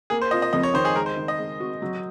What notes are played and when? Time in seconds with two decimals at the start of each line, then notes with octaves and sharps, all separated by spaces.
0.10 A#3 G#4
0.21 C5
0.31 F4 D#5
0.42 D#5
0.53 F2 D#5
0.63 C#5
0.74 D#3 C5
0.85 G#4
0.96 G#3 A#4
1.06 C5
1.17 D#3
1.28 D#5
1.38 G#3
1.60 F#4
1.82 F#3